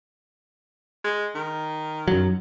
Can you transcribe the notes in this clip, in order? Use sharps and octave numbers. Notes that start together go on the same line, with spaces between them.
G#3
D#3
F#2 F#3